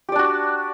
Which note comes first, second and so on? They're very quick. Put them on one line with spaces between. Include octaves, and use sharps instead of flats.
G4 D5 D4 F#4